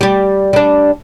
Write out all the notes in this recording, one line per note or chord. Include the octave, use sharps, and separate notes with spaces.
G3 G4
G3 D4